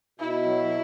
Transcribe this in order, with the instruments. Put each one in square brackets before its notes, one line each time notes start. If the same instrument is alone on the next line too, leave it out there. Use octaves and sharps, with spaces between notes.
[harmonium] B2 [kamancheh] E4
[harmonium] F#3
F#3